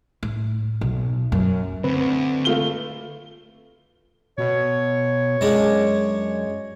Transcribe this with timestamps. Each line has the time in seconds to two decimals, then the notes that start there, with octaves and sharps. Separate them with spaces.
0.23 A2
0.81 B1
1.32 F#2
1.84 D2 C4 B4
2.45 A3 F4 G7
4.38 B2 C#5
5.41 F#2 G#3 D4